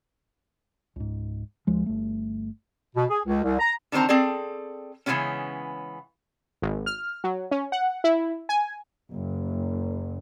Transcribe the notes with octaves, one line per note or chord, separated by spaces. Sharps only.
C#2 G#2
D2 F3 G#3
G1 A3
B2
G#4
C#2
C2
A#5
D3 D#3 C4 C5 A#5
C4 G#4 A4 D5
C#3 E3 F3 G#3 B3 C#4
G#1
F6
F#3
C#4
F#5
E4
G#5
F#1